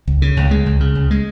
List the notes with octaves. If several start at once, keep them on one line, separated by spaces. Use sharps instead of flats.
C#2
C#3
C#2
G#3
C#2
C#3
C#2
G#3